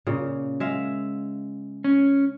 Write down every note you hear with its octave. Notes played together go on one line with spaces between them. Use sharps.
A#2 C#3
G#3 E5 F5
C#4